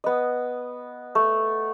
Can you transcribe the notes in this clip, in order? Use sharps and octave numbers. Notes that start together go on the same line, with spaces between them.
B3 D#5
A3